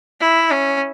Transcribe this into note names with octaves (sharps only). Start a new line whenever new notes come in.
E4
C#4